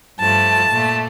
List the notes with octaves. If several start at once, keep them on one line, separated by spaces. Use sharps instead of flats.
G2 F3 A3 A5
A#2 A3